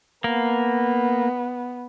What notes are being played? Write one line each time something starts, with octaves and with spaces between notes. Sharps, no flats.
A#3 B3